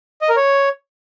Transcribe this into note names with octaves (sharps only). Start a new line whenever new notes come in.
D#5
A#4
C#5